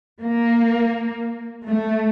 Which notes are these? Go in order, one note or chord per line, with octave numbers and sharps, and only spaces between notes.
A#3
A3